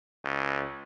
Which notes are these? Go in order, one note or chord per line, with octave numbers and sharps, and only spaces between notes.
C#2